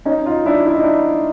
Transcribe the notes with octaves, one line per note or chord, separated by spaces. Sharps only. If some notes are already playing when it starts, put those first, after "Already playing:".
C#4 D#4
D#4 F4
D4 E4
E4
D#4
D4 E4